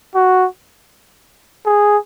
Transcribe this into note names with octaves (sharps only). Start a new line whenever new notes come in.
F#4
G#4